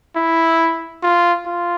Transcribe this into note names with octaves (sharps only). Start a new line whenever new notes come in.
E4
F4
F4